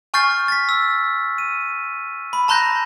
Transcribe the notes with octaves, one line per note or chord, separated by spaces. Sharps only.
G#5 C#6 F6 G6 A6 C7
A6 B6
E6
D#7
B5
A5 A#5 C6 F#6 G6 A#6